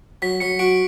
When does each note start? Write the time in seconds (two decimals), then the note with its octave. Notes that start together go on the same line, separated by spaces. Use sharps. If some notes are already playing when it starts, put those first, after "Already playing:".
0.22 F#3 B6
0.40 F#3 C#7
0.59 F#4 D7